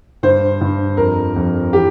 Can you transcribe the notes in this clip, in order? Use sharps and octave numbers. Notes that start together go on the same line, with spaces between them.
G2 C5
G2
F2 A#4
F2
E3 G4